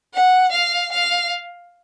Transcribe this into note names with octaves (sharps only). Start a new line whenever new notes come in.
F#5
F5
F5